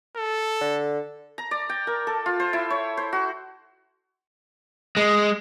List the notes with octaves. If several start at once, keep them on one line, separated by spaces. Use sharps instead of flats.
A4
D3
A#5
D5
G5
A#4
A4
F4
C5
E4
C#5
C5
F#4
G#3